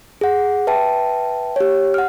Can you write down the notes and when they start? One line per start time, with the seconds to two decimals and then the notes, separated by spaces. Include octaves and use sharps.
0.21 G#4 F#5
0.67 B4 E5 G5 A5
1.56 G4 C#5
1.94 F#5 F6